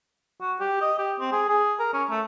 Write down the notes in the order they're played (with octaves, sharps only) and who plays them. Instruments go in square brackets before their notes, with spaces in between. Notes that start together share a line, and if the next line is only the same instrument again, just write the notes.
[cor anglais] F#4
G4
D#5
G4
C4
G#4
G#4
A#4
C#4
A3